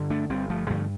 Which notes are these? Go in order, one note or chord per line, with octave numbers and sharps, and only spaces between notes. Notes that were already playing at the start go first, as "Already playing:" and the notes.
Already playing: G2 D3
A3 D4
G1 G3 C4
F3 A3
G2 D3 F3 A3